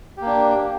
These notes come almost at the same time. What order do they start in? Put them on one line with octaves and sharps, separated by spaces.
G4 A#3 D4